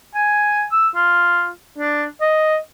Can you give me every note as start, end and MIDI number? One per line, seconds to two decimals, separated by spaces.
0.15 0.64 80
0.72 0.88 88
0.96 1.49 65
1.78 2.05 62
2.21 2.57 75